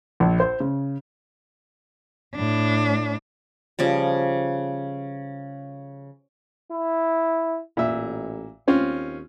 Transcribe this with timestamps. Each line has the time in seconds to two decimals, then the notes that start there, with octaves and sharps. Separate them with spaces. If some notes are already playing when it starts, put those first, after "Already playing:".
0.20 A#1
0.40 C5
0.60 C#3
2.36 A2 D4
3.79 C#3 F3 G3
6.71 E4
7.77 A1 A#2 E5
8.68 D#2 C4 C#4 F4